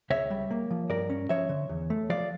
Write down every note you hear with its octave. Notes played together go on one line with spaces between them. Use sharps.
C#2 C#5 E5
G3
A#3
F3
G2 A#4 D5
C#4
F3 C#5 E5
D3
E2
A3
F3 D5 F5